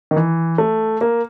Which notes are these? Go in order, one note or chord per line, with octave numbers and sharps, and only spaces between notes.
D#3
E3
A3
A#3